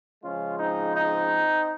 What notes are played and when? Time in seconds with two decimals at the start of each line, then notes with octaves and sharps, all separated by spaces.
0.23 C#3 F3 G#3 C#4 F4
0.59 C4 D#4
0.96 C4 D#4